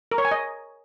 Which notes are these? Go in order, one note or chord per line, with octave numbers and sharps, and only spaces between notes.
A#4
C#5
G#5
D#5